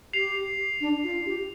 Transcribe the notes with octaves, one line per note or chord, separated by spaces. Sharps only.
G4 C7 F7
D4
F4
G4